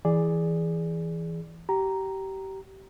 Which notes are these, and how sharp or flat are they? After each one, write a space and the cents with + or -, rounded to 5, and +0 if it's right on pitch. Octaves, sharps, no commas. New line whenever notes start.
E3 +0 G#4 +0 D5 +0
G4 -25 A#5 +0